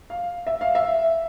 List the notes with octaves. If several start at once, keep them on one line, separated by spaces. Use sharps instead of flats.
F5
E5
F5
E5